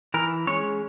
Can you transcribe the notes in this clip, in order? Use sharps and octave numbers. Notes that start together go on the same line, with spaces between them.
E3 A#4
G#3 C#4 C#5